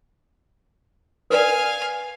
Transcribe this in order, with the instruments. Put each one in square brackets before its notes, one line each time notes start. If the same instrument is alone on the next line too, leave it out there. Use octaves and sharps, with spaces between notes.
[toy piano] A#4 B4 D5 [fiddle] F5 G#5